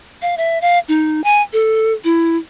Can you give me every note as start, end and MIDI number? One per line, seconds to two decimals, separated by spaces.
0.22 0.35 77
0.37 0.60 76
0.61 0.79 77
0.88 1.23 63
1.24 1.42 80
1.53 1.93 69
2.04 2.37 64